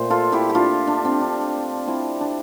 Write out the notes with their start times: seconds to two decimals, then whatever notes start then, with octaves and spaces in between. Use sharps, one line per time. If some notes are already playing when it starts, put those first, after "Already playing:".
Already playing: A#2 A3 C5
0.10 F4 A4
0.32 E4 G4
0.49 G4
0.55 D4 F4
0.87 D4
1.05 C4
1.21 D4
1.87 C4 E4
2.21 D4